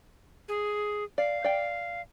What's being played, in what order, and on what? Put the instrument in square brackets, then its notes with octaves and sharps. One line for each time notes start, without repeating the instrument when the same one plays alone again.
[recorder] G#4
[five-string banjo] D5 [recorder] F5
[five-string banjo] D5 G5